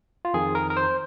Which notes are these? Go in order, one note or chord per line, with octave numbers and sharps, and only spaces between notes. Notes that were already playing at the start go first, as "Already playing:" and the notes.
F4
F2 D#3 G#4
A#4
A#4
C5